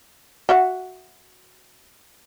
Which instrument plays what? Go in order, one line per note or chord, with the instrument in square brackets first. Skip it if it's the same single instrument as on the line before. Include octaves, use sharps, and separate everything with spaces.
[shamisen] F#4 E5 F#5